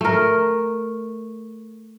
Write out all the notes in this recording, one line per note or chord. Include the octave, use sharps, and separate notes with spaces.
A3 A#4